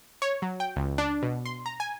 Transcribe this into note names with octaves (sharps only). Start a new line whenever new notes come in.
C#5
F#3
G5
C#2
D4
B2
C6
A#5
G#5